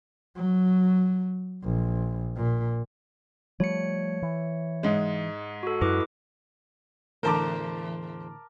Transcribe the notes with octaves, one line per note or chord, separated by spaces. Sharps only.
F#3
A#1
A#2
F3 G3 A3 C#5 C#7
E3
G#2 G#3
F#4 A4
F#2 E4 B4 D6
E2 A2 D3 A#4 C5 A5 D6